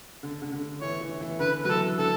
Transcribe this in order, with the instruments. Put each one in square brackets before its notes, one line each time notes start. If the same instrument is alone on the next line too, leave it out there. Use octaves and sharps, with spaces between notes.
[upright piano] D3
D3
D3
[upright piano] E3 [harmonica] C#5
[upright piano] E3
E3
[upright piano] D3 [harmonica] B4
[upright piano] F#3 [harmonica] B4
[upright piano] E3 [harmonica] A4
[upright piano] D3 [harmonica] A4